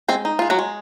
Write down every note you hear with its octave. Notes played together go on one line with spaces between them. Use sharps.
G#3 C4 C5
D#4
G#3 F4
F#3 F#4
G#3